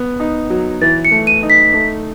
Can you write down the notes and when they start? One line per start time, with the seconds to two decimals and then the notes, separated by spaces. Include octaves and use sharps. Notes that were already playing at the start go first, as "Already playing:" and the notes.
Already playing: B3
0.20 D#4
0.50 F#3
0.81 E3 A6
1.05 C#7
1.11 A3
1.27 D#7
1.43 D#4
1.50 B6
1.74 A3